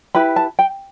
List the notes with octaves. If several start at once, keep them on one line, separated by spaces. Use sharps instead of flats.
E4 G4 B4 B5
A5
G5